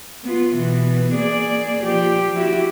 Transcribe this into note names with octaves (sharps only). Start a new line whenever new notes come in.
B3 F4
B2 E3 B3
A#3 G#4 D5
F3 G4
E4 F#4 G4